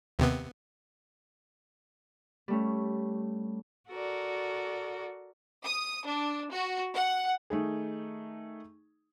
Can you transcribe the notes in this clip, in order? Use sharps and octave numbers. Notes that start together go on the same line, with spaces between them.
D#2 C3 B3
G3 A3 C#4
F#4 A4 A#4 D5
D#6
D4
F#4
F#5
D#3 A3 D#4 G#4